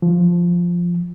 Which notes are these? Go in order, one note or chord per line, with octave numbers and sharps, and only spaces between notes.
F3